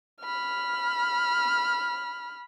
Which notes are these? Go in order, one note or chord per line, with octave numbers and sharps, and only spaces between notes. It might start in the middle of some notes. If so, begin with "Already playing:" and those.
B5 F6